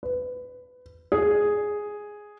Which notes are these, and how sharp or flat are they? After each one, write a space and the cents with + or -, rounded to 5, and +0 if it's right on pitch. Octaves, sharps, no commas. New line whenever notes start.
B4 +20
G#4 +0